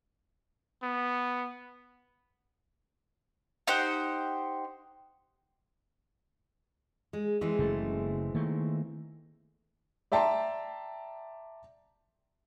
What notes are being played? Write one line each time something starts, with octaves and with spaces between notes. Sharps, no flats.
B3
D#4 G4 C5 F#5
G#3
E3 G#3 C4
F#1 C#3 A3
D#3 A3 A#3
D5 E5 G5 A5 A#5 C6